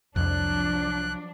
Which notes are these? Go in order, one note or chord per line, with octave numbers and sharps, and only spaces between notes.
C2 F2 F3 F#3 D4 F#6